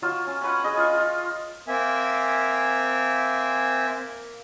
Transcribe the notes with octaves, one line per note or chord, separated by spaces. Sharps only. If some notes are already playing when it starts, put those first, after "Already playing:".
F#3 F4 E6
C#4
C#4 B4 F#5
G#4 B4 D#5
F4 C6 C#6
F4
A#3 C4 E5 G#5